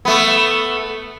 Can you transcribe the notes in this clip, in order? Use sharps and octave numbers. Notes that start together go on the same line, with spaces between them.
A3 B3